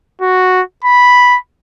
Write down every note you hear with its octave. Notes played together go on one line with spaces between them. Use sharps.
F#4
B5